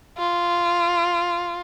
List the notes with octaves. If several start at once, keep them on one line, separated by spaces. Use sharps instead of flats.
F4